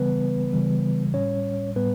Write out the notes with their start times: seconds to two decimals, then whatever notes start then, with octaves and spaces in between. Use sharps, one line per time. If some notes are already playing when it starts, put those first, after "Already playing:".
Already playing: C#3 E3 G3 B3 B4
0.53 C#3 E3 G3
1.14 A2 G3 C#4 C#5
1.76 A2 G3 B3 B4